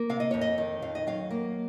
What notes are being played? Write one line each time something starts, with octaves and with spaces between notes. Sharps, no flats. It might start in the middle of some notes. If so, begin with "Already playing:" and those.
Already playing: A#3
C3 F5
D#5
F2 C#5
D#5
D#3
F2 F5
D#5
F#3 F5
A#3